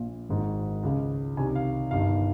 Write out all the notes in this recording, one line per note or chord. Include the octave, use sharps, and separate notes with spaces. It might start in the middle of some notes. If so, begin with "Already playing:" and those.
Already playing: A#1 A#2
G#1 G#2 D#3
C#2 C#3
C2 C3 D#3 G#5
F5
G1 G2 D#3 F5